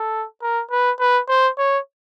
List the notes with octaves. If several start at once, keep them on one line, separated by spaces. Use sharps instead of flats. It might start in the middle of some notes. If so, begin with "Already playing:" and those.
Already playing: A4
A#4
B4
B4
C5
C#5